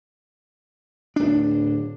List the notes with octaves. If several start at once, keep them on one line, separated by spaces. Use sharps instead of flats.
D1 D4